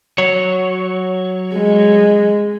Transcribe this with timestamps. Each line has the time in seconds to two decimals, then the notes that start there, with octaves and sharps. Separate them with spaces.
0.18 F#3 C#5
1.55 G#3